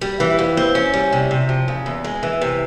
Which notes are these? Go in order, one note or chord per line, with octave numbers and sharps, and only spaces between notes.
G3
E3
F2
C4
C#4
G3
C3
C3
F3
C#3
E2
G#3
E3
C3